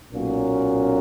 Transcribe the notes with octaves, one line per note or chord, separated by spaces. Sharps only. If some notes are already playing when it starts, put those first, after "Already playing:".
B1 A#2 A#3 C#4 F#4